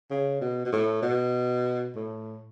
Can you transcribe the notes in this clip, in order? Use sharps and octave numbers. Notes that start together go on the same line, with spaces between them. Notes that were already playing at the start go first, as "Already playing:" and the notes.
C#3
B2
B2
A2
B2
A2